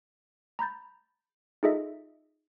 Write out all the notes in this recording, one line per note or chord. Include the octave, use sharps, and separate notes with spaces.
A#5 B5 G6 A6
D#4 F4 G#4 A4 D#5 E5